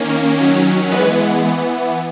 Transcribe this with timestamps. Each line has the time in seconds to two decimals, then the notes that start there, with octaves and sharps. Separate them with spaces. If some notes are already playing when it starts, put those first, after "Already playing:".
Already playing: D#3 A#3 C#4
0.38 D#3 F#3 C#4
0.91 E3 G#3 B3 B4
1.45 E3 B3